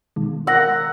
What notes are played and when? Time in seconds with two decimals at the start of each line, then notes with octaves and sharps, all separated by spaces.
0.16 B2 D#3 G#3
0.47 A#4 F#5 E6 A#6